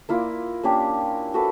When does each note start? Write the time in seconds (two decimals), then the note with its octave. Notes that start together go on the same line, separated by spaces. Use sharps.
0.09 A#3 E4 F4 D5
0.63 A#3 C#4 D4 G4
1.34 F#4 A4 B4